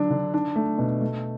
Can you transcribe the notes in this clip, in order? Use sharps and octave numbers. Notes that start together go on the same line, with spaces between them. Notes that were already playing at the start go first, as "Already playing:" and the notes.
Already playing: D3 F#3 D4
D3
D4
A3
B2
A3